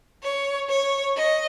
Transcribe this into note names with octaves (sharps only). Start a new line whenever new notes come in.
C#5
C#5
D#5